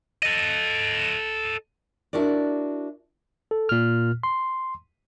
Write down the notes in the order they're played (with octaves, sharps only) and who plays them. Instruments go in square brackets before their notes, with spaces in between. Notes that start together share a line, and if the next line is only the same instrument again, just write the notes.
[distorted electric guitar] A4 D#5
[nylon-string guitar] D4 E4 F#4 A#4 D5
[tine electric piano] A4
A#2 F6
C6